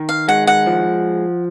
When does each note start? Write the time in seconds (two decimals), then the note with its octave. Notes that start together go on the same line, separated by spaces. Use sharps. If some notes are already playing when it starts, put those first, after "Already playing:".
Already playing: D#3
0.09 F5
0.28 G#3 F#5
0.47 F#5
0.66 F3